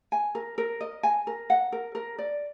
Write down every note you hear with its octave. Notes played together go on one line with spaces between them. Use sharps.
G#5
A#4
A#4
D#5
G#5
A#4
F#5
A#4
A#4
D5